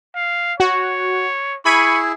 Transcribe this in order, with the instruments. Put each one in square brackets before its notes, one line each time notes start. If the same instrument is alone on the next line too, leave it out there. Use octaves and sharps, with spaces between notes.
[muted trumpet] F5
[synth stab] F#4 [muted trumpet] C#5
[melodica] E4 G#4 [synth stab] B5 G#6 D#7 [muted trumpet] C#6